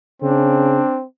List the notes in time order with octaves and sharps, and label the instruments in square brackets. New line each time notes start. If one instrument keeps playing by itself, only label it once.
[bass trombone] C#3 [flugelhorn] C4 [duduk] D4